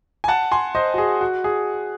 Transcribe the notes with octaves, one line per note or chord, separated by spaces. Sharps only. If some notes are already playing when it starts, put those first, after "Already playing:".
G#5
F#5 A5
G#5 C6
C5 D#5
F#4
G#4
F#4
G#4